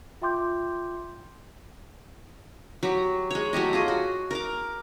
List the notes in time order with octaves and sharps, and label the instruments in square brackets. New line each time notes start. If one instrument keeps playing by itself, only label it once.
[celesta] F4 E5 G5 C6 D6 G6
[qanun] F#3 G4
G#3 C#5
F#3 A3 G4 D#5
F4 G#4 D#5
F#4
A#4 A#5 D6